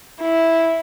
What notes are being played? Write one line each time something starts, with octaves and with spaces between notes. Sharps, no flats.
E4